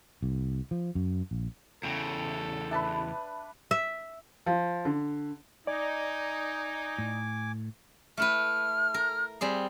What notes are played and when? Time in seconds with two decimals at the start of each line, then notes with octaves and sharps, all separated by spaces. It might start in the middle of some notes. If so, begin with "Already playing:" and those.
0.23 C2
0.71 F3
0.95 F#2
1.31 A#1
1.83 E2 C#3 A4 G5
2.71 D4 B4 E5 A5 B5
3.71 E5
4.46 F3
4.85 D3
5.67 D#4 D5 G#5 D6
6.98 A2
8.17 A3 E4 B4 F6
8.94 A#4
9.41 G3 C4 G#4